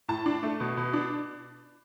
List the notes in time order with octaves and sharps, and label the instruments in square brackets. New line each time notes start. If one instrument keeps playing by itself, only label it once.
[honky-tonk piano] A2 A5
D4
A3
B2
B2
D4